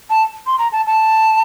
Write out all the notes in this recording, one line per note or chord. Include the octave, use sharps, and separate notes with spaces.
A5
C6
A#5
A5
A5